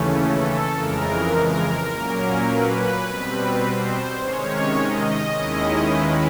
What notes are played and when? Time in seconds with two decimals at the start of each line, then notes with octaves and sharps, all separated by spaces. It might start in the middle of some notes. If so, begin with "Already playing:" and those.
Already playing: D#2 C#3 E3 A3 C#4
0.19 A4
0.75 F2 C#3 E3 G#3 A#4
1.91 A#2 F#3 A#3 C#4
2.48 B4
3.05 B2 G3 C4
3.63 C5
4.20 C3 D#3 G#3 C#4 C#5
4.79 D#5
5.35 D#2 D#3 G#3 C#4 E4
5.93 B4